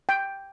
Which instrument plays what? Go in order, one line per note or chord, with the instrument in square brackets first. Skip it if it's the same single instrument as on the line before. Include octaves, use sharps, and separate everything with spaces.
[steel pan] G5